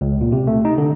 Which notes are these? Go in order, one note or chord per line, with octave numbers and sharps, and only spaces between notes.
C#2
A#2
C3
A3
D#4
D3